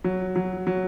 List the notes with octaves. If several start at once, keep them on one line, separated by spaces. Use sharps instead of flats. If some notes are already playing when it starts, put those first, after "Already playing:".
F#3
F#3
F#3